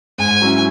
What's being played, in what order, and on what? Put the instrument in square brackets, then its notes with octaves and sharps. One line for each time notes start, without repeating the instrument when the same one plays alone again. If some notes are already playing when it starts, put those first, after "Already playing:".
[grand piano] G#2 [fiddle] G#5
[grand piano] F#3 C#4 E4